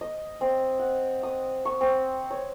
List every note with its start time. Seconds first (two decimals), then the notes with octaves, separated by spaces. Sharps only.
0.01 D#5
0.41 C4
0.79 F#5
1.23 D#6
1.65 C#6
1.81 C4
2.31 C#5